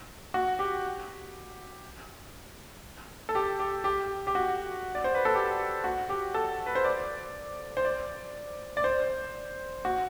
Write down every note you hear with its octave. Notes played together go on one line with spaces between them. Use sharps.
F#4
G4
A4
G4
G4
G4
G4
F#4
D5
C5
B4
A4
G4
F#4
G4
A4
B4
C5
D5
C5
D5
D5
C5
F#4